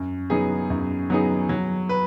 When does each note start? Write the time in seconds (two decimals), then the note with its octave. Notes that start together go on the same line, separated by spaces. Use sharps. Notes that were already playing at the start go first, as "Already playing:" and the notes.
Already playing: F#2
0.30 F#3 B3 D#4 G#4
0.70 F#2
1.10 F#3 B3 D#4 G#4
1.49 F#3
1.89 B4